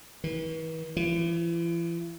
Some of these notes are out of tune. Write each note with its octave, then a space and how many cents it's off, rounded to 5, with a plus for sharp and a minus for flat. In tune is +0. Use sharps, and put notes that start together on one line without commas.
E3 -40
E3 +40